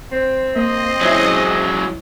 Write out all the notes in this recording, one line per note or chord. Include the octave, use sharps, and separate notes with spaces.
C4
A#3 D#5
F#3 G#3 C#4 E4